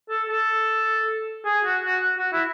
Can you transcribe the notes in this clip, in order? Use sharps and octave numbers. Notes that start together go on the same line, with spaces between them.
A4
A4
G#4
F#4
F#4
F#4
E4